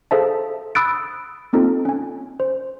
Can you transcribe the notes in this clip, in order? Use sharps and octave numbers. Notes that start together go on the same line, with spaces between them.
G#4 A4 C5 E5 F5 A5
B5 D#6 E6 F#6 A6 D7
A#3 C4 D#4 F4 A4
C#4 G#5
C5